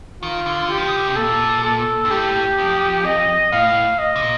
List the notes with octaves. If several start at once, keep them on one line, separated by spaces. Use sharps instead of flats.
D#3 F4
D3
G4
F3
D#3
D3
C3
A#2 A4
A4
G2
A2 G4
F2
D#5
A2 F5
D#5
C3
A#2